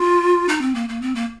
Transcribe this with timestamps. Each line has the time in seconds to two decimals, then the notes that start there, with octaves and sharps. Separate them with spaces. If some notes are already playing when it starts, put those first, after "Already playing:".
Already playing: F4
0.49 D#4
0.61 C4
0.75 A#3
0.89 A#3
1.02 C4
1.15 A#3